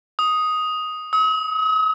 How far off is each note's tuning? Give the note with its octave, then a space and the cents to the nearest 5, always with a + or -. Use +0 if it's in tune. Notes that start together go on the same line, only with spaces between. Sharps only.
D#6 +5
D#6 +45